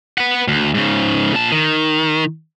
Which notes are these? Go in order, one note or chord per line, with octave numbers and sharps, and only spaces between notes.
B4 F#5
D2
G#2 C#3
A#2 A5
D#3